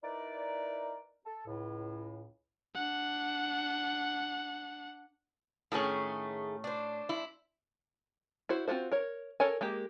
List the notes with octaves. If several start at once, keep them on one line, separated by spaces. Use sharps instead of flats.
D#4 E4 A#4 B4 D5
A4
C#2 A2
D4 F#5
A2 D#3 A3 C#4 G#4
D4 C5
E4
E4 F#4 C5
C4 C#4 F4 F#4 C5
A#4 C#5
A4 A#4 C#5 G#5
G#3 A#3 G4